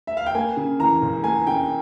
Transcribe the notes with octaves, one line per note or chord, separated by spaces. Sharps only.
E5
F5
G5
A#3 G#5
C#3
E3 A#5
C#2
A#3 G#5
C#3 G5